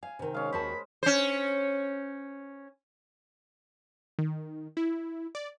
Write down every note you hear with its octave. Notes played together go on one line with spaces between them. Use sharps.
F5 G#5
C3 D#3
G#3 C#4 F5
D#2 F#4 C5 A5 B5
C#4 C5
D#3
E4
D5